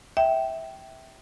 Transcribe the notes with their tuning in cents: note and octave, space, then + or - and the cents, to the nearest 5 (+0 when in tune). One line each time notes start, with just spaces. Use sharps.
E5 -15 G5 -10